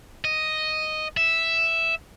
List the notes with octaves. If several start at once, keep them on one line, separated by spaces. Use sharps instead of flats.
D#5
E5